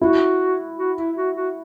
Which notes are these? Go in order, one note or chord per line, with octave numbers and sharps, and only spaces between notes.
E4 F#4
F#4
E4
F#4
F#4